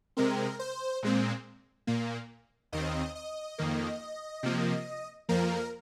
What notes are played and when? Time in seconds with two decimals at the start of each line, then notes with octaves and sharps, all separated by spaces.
0.17 C3 G#3 C4 A#4
0.59 C5
1.03 A#2 G#3 C4
1.87 A#2 A#3
2.72 D#2 D#3 C4 D#5
3.15 D#5
3.58 F2 D#3 A#3
4.43 C3 F3 A#3
5.29 F2 F3 A#3 A#4